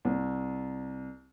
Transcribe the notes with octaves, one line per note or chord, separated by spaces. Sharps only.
C2